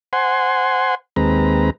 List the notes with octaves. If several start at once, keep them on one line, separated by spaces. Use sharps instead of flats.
C5 F#5 G#5 C6
D#2 G#3 C4 B4 A#5